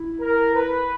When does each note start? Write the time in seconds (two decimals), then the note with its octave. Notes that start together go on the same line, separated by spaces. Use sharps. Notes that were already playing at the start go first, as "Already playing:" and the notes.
Already playing: E4
0.20 A#4
0.55 B4